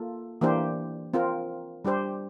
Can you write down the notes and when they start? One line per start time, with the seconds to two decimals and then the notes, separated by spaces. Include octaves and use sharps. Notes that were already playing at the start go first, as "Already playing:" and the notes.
Already playing: A#3 F4 A4
0.41 E3 A#3 D4 G4 C5
1.14 C4 F4 A#4
1.85 G3 D4 G4 C5